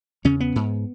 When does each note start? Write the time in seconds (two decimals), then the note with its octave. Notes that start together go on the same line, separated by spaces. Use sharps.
0.25 E2 C#3 C#4
0.40 B3
0.56 G#2